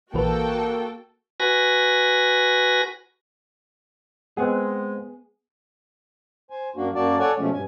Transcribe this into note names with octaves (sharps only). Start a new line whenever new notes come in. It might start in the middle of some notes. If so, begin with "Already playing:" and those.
A#1 E3 A#3 F#4 A4 B4 G5
F#4 B4 G#5 A#6
G#3 B3 C4 G#4 F#5
C5 G#5
F#2 A#3 D4 F#4
F#2 A#3 F#4 D5 A5
A4 C#5 D5 F#5 G#5 A5
B2 F3 G#3 A3 C#4
G2 G#5